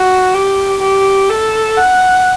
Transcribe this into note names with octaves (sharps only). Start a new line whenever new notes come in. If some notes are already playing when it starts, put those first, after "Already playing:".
Already playing: F#4
G4
G4
A4
F#5